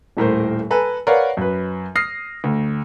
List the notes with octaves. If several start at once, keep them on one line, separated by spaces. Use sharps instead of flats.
D#1 A2 A#4 C5
A4 B4 G#5 A#5
A#4 B4 C#5 D5 F5 F#5
F#2 B4
D#6 F6 A#6 C7
D2